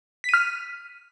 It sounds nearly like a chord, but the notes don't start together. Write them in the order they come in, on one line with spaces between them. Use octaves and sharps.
B6 D#7 F6